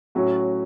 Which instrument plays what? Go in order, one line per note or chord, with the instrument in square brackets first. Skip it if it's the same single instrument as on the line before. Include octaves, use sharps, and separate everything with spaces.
[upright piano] A2 F#3 C#4 F#4